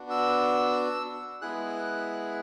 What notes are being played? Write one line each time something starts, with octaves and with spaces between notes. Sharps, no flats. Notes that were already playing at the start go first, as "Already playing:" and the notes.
Already playing: B3 D4 F#4
E6
G#3 B3 E4 G#4 F#6